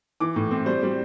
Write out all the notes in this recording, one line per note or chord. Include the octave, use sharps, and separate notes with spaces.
E3 D6
A2
C4
G3 C5
G3